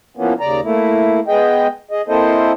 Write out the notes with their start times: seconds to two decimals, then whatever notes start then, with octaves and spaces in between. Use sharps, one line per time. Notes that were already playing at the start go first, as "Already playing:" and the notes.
0.17 E3 F3 A#3 B3 C#4
0.40 D#2 C#3 D5 A#5
0.63 A3 A#3 E4
1.28 G#3 B3 G#4 D#5 G5
1.91 G#4 D#5
2.08 A#3 C4 E4 A4 C5 D#5